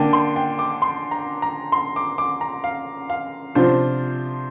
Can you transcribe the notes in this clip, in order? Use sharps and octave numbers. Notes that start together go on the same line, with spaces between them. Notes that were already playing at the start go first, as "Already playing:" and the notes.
Already playing: D3 A#3 D4 G5
C6
G5
D6
C6
A#5
A#5
C6
D6
D6
A#5
F5
F5
C3 F3 D4 F4 C5